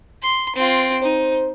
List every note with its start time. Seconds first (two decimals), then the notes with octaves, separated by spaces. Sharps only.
0.22 C6
0.56 C4 F4
1.02 D#4 C5